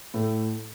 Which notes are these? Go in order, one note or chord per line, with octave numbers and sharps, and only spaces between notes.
A2 A3